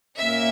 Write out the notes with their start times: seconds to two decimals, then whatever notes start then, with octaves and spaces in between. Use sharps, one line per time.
0.18 A#2 A#3 C#4 E5